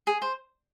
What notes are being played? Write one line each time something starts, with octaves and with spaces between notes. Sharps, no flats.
G#4
C5